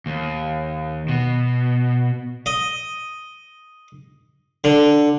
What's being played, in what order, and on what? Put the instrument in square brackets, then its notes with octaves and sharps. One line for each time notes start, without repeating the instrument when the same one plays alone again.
[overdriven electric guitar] D#2
B2
[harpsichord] D#5
D3